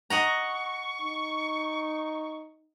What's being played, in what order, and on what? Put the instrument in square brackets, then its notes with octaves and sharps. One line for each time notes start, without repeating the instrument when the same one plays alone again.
[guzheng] D#5 F#5 A#5 [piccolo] C#6
[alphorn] D#4